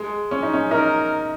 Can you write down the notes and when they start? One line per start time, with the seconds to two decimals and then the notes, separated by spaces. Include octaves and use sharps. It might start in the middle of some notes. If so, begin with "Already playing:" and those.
Already playing: G#3
0.31 C#4
0.43 D#4
0.54 C#4
0.71 D#4 A#4